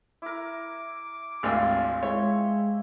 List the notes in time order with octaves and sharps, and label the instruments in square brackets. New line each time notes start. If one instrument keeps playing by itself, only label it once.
[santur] E4 A#4 [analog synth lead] D6
[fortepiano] G#1 D2 [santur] C4 F4 G4 [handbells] F5 G#5
[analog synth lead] G#3 [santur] E4 G5 [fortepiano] C#5